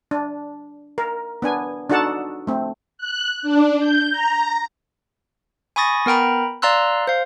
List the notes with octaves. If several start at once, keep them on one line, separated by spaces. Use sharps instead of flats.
D4
A#4
B3 D4 G#5
D4 D#4 F#4 A4 F#5 A5
A3 C4
F#6
D4
G6
A#5
G#5 B5 C#6 D#6 A6 A#6
B3 A#4 G5 A#5 B5
D5 F5 A#5 C6 E6 F#6
C5 F5